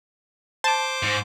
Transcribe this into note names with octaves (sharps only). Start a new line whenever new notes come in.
C5 A5 D6
G#2